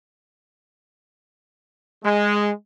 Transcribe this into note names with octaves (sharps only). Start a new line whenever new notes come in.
G#3